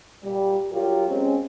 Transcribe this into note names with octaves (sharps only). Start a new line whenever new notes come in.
A#2 G3
F#3 F4 G4 A#4
G#3 C4 C#4